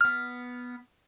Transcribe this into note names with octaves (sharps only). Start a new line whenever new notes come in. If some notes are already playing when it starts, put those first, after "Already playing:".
B3 F6